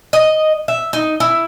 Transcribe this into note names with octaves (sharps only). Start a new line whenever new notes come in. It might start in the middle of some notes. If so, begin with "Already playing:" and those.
D#5
E5
D#4
E4